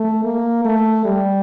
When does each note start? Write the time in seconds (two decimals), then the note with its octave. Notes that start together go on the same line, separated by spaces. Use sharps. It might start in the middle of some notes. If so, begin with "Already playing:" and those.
Already playing: A3
0.24 A#3
0.65 A3
1.05 G3